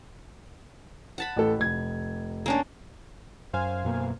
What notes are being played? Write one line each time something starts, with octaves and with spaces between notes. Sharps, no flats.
F#5 A5 B5
A1 A4
F1 G#6
A#3 C#4 D4
F#2 C5 F5 G#5
F#2 B2 A#3